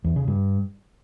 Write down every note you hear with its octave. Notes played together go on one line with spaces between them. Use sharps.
E2
C#3
G2